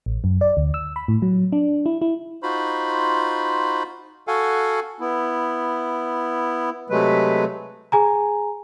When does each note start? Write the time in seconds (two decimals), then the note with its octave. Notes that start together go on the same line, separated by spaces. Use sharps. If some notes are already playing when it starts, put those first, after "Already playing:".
0.06 A1
0.24 F#2
0.41 D5
0.57 D2
0.74 E6
0.96 B5
1.08 A2
1.22 F#3
1.52 D4
1.86 E4
2.02 E4
2.43 D#4 F4 F#4 C5 B5
4.27 F#4 A4 F5 F#5 G#5
5.00 B3 E4
6.90 C3 F#3 G#3 A3 B4
7.92 G#4 G#5 A#5